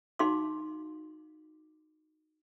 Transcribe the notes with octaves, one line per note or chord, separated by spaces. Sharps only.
D#4 F#4 F5 C6 D6